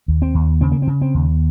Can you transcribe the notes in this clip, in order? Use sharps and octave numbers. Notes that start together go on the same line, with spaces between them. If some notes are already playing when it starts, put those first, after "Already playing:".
D#2
C4
D#2
C#3 C4
A#3
C4
C#3
C4
D#2